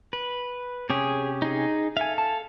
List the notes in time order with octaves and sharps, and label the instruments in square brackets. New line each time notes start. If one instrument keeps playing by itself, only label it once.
[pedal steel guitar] B4
[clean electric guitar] C3 C#4 G4 [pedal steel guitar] G#4
[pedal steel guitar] D#4 G#4
[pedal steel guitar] A4 F5 [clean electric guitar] E5 G#5
[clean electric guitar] A5